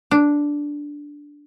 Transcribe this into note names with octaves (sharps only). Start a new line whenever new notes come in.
D4